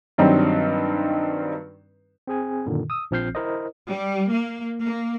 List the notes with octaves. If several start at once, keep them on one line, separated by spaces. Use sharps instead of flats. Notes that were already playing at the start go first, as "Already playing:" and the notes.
G2 D#3 F#3 G3 C4 D#4
C4 G#4 G#5
F#2 A#2 D3 D#3
D#6 E6
A#1 F3 C4 F6 G6 C7
E4 A#4 C5 D#5
G3
A#3
A#3